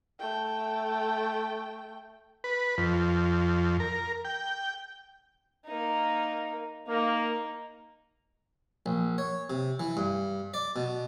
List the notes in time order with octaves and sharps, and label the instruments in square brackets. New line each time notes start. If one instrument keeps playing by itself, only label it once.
[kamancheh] A3 G5
[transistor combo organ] B4
F2
A#4
G5
[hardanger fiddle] A#3 D#4
[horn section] A#3 [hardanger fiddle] D#4
[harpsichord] A#1
C#5
C3
E3
G2
D5
B2